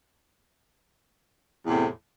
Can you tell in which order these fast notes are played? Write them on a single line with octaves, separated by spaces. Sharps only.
E2 A2 C3